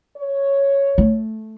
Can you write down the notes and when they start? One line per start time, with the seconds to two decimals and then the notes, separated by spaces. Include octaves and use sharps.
0.16 C#5
0.98 A3